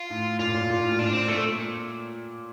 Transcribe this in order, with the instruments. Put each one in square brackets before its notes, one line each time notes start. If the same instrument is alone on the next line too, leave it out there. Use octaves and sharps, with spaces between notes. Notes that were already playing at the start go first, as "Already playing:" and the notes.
Already playing: [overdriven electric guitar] F4
[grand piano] A2
[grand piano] A#2 [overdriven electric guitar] F4
[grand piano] A#2
A#2
A2
A#2
[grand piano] A2 [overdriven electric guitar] D4
[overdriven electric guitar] C4
[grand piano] A#2 [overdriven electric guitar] A3